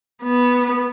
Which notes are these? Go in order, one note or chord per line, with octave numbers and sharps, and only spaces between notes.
B3